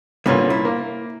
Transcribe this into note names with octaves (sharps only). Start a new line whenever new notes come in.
C2 A#2 D3 C#4 B4
E4
A#3